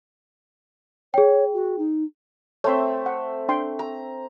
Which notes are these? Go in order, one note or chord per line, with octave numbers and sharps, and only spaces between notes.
G#4 C#5 G5
F#4
D#4
A3 C4 C#5 E5 C6
F#5
D4 G5 C6
A#5